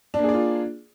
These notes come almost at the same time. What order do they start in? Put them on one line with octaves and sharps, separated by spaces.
D4 A#3 G#4 D5 F4